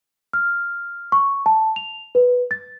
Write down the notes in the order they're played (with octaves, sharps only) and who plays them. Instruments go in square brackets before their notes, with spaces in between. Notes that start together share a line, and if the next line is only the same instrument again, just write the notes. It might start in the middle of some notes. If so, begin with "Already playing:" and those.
[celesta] F6
C#6
A5
F7
B4
A6